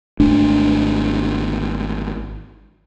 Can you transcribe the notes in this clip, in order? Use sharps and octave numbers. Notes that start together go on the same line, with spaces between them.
G#1 A3 D4